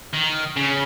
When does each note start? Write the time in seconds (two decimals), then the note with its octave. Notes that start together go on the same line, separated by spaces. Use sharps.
0.14 D#3
0.56 C#3